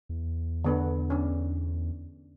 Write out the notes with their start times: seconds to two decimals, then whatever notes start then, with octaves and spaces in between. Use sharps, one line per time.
0.09 E2
0.64 D3 B3 A4
1.10 C#4 D4